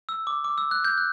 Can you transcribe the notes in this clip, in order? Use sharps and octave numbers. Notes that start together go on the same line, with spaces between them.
E6
D6
D6
E6
F#6
G6
F#6